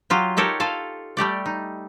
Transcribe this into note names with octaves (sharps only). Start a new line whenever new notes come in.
F#3 F4 G4
D#4 G4 A4 A#4 C#5
F4 A4 F5
G3 A3 G4 D5
D#4